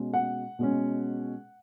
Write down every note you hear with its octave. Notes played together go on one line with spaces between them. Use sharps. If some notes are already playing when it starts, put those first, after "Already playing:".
Already playing: B2 G#3 C#4
F#5
B2 G#3 C#4